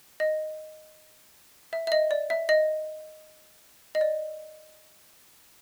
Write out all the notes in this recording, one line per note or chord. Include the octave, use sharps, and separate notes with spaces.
D#5
E5
E5
D#5
D5
E5
D#5
D#5
D5